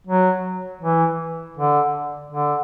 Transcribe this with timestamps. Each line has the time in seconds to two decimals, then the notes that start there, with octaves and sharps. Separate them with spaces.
0.07 F#3
0.81 E3
1.57 D3
2.32 D3